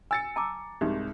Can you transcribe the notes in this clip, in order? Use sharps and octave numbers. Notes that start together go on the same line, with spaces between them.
G#5 E6 A6 C#7
A5 A#5 D6
C2 G#2 D#4 G4